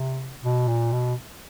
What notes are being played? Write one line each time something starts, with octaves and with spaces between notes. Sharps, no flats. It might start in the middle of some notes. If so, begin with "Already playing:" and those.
Already playing: C3
B2
A#2
B2